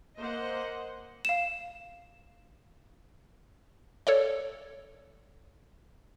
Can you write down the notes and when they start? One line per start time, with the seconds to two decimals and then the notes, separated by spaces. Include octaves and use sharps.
0.17 A#3 C5 D#5 F#5
1.25 F5 E7
4.07 A4 C#5 D5